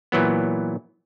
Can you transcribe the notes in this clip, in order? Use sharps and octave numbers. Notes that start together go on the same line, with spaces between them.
A#2 E3 F#3 B3